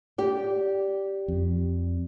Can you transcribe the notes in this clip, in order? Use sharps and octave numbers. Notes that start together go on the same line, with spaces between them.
G4 D5
F2